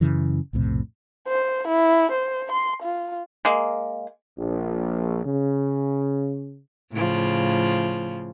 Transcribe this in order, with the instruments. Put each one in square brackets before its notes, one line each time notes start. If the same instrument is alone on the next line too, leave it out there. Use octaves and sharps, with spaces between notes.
[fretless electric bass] F#2 C#3 E3
B1 F2 A2 C3
[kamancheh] C5
E4
C5
C6
F4
[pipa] G#3 A#3
[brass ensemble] A#1
C#3
[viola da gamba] A2 C#3 F3